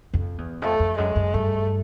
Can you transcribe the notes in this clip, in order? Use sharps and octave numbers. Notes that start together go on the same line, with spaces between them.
F2
E2
F2 A3
F2
F#2 G#3
F#2
G2 A3